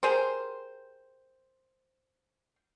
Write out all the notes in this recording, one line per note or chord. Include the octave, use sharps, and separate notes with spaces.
G4 G#4 A#4 C5